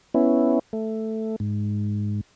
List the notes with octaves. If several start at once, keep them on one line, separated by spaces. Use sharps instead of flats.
B3 C#4 E4
A3
G#2